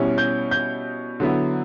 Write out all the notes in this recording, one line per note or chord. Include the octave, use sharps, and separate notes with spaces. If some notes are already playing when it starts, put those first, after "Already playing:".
Already playing: B2 G3 C#4 E4
G6
G6
D3 F#3 B3 E4